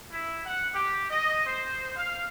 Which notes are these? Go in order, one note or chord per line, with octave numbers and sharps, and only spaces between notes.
E4
F#5
G4
D#5
C5
F5